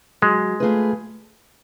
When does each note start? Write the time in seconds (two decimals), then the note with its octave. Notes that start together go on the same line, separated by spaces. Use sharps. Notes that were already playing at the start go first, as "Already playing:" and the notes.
0.22 F#3 G#3
0.60 A3 F4 G#4 B4